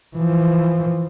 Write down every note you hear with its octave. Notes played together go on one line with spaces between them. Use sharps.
E3 F3